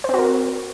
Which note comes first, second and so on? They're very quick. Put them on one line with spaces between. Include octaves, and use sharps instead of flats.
C5 C4 F#4 A#4